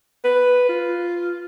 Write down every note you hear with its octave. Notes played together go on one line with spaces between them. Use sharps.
B4
F4